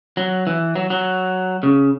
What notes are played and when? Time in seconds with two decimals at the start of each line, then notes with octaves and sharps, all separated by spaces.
0.17 F#3
0.47 E3
0.76 F#3
0.90 F#3
1.63 C#3